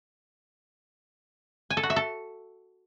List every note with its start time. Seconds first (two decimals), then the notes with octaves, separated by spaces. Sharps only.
1.70 G#5
1.77 A4
1.83 F#4
1.90 E5
1.96 A4